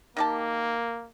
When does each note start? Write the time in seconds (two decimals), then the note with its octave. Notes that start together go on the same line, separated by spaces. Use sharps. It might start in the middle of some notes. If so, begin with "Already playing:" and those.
0.17 D#3 A#3 G4 A5